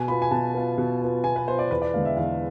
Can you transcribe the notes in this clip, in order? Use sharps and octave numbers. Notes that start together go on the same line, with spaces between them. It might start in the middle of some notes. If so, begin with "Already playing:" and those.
Already playing: B2 G#5
B3 F4 B5
G#5
B2 A5
B3 F4
B2
B3 F4
B2 G#5
B4
B3 F4 C5
D5
E2 B4
D5
D3 G#3 B3 F5
E5
E2 F5